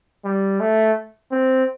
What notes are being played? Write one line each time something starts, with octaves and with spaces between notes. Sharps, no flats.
G3
A3
C4